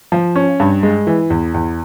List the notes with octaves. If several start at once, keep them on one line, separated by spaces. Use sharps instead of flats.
F3
C#4
G2
G#3
E3
E2
E2